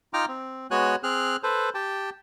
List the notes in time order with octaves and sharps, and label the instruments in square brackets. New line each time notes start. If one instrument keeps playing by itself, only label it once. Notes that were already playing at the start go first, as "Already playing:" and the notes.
[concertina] D#4 F4 G5 A#5 D6 F6
C4
G#3 B3 F#4 C#5 G#5 F#6
C4 G#4 F6 F#6
A4 B4 C5
G4 G5 A5